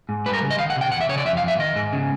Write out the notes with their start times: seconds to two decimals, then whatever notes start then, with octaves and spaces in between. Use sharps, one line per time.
0.09 G#2
0.26 G3 B4
0.33 A#4
0.42 C#3
0.50 D#5
0.59 D#3 F5
0.70 F#5
0.76 C3
0.81 G5
0.92 E2 F#5
1.01 E5
1.09 C#3 C#5
1.18 D5
1.25 F2 E5
1.37 F5
1.43 F2 E5
1.59 D#3 D#5
1.75 G#2
1.93 C#3